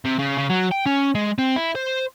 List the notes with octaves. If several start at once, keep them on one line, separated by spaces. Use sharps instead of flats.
C3
C#3
C#3
F#3
G5
C#4
G#3
C4
E4
C5